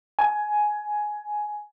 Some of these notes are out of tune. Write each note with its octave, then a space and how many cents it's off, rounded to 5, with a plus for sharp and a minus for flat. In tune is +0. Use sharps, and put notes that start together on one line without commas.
G#5 +10